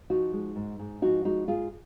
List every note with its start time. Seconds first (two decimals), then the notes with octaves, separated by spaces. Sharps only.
0.10 F3 D#4 F#4
0.33 G#3
0.56 G#2
0.79 G#2
1.02 F3 D#4 F#4
1.25 G#3 D#4 F#4
1.48 G#2 F4 G#4